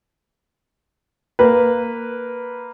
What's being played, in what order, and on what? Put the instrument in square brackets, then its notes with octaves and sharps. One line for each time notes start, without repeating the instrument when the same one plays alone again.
[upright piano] A#3 B4